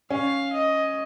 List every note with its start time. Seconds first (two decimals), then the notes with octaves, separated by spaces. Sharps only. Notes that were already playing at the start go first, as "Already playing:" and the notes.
0.10 C#4 F5
0.53 D#5